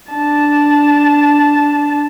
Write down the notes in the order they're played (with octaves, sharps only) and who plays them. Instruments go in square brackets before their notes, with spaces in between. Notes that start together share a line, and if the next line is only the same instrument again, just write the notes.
[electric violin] D4 A5